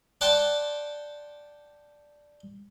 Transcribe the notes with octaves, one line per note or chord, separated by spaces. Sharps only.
D5 F#5 G5 A5 C6 D6